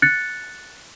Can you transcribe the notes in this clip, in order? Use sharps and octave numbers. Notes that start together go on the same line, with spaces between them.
F#6 A6 C#7